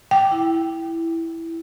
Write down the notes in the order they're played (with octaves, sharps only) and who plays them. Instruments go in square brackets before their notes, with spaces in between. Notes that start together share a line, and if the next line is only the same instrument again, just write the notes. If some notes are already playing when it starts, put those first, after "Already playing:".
[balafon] G5 [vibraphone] D6
[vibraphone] E4